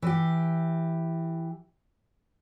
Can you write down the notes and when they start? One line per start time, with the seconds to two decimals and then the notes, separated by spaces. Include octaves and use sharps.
0.02 E3 G4